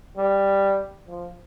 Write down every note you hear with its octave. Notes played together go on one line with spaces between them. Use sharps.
G3
F3